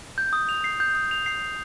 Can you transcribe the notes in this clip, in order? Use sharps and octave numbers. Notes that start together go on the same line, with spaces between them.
G6
D#6
F7
C7
G6
D#6
F7
C7
C7